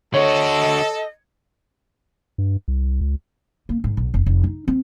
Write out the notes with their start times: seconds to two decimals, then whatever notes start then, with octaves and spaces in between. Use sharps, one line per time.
0.14 D3 F#4 A4 C#5 D#5
2.38 G2
2.68 C2
3.01 C#2
3.69 A#3
3.84 G#2
3.97 B1
4.14 F1
4.26 F1
4.44 D#4
4.68 C4